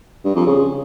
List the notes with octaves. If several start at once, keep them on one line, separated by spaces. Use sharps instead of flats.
G2
F2
C#3